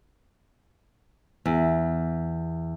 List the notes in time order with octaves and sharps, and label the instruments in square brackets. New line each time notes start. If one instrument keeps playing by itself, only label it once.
[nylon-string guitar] E2